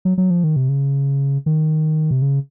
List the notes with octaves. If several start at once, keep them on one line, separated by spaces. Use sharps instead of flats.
F#3
F#3
F3
D#3
C3
C#3
D#3
C3
C#3